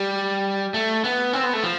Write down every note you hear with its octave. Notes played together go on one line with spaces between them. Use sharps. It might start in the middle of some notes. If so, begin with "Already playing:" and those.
Already playing: G3
A3
B3
C4
B3
A3
F3